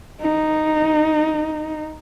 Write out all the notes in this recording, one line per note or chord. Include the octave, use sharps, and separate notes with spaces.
D#4